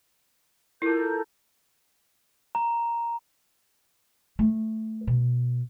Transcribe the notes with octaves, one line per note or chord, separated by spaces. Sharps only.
E4 F4 A4 A#4 G6
A#5
A3
B2